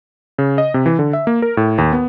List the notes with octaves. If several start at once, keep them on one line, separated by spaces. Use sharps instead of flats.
C#3
D#5
C3
E3
D3
E5
A#3
A#4
A2
D#2
B3